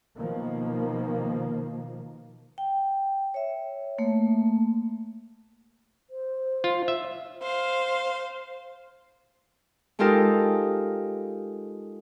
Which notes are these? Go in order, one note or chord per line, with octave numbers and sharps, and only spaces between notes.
B2 D#3 F3 A#3
G5
C#5 E5
A3 A#3
C5
F4
E5
C5 F5
G#3 D#4 F4 G4 A4 A#4